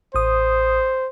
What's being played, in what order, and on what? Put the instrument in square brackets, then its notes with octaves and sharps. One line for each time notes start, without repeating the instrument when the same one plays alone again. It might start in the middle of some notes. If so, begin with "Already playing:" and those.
[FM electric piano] A1 D#6 [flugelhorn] C5